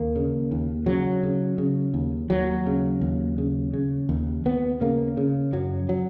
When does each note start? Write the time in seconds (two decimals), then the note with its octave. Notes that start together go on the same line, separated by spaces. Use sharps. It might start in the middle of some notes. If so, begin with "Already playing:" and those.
Already playing: D#2 A#3
0.16 C#3
0.52 D#2
0.86 C#3 F#3
1.23 C#3
1.58 C#3
1.94 D#2
2.30 D#2 F#3
2.66 C#3
3.01 D#2
3.38 C#3
3.74 C#3
4.09 D#2
4.45 D#2 B3
4.81 C#3 A#3
5.17 C#3
5.52 F#2 F#3
5.89 F#3